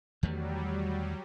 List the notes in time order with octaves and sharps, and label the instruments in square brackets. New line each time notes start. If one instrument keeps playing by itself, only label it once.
[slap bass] E2 D#3 A3 [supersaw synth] F#3 G3